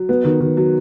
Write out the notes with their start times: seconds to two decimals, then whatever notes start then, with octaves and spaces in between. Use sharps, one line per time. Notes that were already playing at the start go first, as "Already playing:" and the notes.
Already playing: F#3
0.09 B3
0.24 D#3
0.40 D#3
0.57 F#3